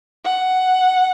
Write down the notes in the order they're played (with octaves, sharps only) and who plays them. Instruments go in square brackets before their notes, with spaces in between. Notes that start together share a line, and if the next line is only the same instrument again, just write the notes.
[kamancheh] F#5